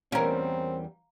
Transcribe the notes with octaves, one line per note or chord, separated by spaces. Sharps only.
E2 E3 G3 C4 C#4 A#4 F5 A#5